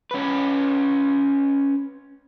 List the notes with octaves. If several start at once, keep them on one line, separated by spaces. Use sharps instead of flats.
C#4 B4